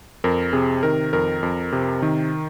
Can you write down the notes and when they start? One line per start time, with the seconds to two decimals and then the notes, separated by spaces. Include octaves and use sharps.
0.24 F2 A#4
0.53 C3 G#4
0.83 D#3 A#4
1.13 F2 A#4
1.43 F2
1.72 C3
2.02 D#3